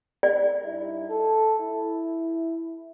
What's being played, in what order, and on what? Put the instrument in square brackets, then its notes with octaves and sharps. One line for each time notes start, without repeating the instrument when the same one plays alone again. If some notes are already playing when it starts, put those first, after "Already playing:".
[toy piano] D5
[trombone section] G2 D#4 E4
A4
E4